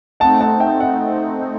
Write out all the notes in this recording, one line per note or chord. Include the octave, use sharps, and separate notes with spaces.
A3 C4 D#4 F#5 A5
F#5 A5
E5 G5
D#5 F#5